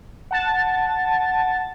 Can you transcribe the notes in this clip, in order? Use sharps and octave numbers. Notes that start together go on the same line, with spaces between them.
F#5 A5 A6